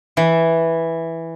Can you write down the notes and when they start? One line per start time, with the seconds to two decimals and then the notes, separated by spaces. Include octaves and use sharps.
0.17 E3